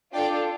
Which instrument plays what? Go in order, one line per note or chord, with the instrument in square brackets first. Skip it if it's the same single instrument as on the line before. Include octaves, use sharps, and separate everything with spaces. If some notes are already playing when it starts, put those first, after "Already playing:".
[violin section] D4 F4 A4 D5 G5